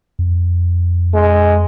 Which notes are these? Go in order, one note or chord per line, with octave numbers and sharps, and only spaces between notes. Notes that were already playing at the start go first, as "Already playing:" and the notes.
F2
G#3